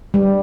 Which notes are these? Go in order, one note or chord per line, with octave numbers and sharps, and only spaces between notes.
G3